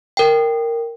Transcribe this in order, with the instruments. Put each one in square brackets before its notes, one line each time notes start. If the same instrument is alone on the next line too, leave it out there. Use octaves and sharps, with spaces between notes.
[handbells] A#4 G5